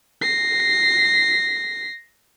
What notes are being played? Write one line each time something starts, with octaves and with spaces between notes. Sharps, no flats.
A#6 C7